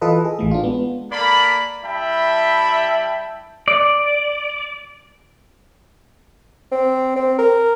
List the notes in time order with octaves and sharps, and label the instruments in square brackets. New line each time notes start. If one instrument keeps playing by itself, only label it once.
[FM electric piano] E3 F4 A4 B4 D#5
G#4
A1 E3 A3
D4 F4
G#3 B3
[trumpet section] A#3 A4 D5 B5
G3 E4 E5 G5 A5 B5
[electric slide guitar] D5
[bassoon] C4
C4
A#4